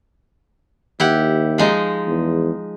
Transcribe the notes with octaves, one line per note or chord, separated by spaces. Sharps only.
D#2 E4 G4 F#5
F3 G#3 D#4
E2